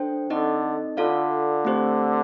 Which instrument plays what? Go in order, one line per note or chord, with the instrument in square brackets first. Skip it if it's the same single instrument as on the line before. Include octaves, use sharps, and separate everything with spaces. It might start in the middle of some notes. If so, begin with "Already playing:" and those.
Already playing: [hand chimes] D4 A4 C5 G5
[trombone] D3 [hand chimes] C4 D#4 A4 D#5
[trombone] D3 [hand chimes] F4 A4 D5 F5
[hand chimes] A3 C4 G4 C5